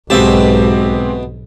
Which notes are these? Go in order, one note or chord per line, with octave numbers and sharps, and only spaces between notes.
B1 G#2 B2 G#3 C4 G4 E5 A5